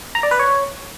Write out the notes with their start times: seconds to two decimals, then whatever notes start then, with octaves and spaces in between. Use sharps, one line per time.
0.15 A#5
0.23 D5
0.31 B4
0.39 C#5